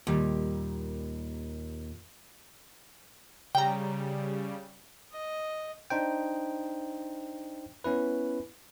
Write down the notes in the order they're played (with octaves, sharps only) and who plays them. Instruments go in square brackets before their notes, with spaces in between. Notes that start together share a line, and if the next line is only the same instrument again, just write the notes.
[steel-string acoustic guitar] D#2 [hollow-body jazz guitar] A#2 G3
[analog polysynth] C#3 G3 [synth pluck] G5 A#5
[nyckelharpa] D#5
[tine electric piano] D4 D#4 C5 G5
B3 C#4 E4 B4